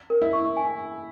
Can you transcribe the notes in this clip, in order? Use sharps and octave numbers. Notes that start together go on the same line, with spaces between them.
A#4
E4
C#6
G#5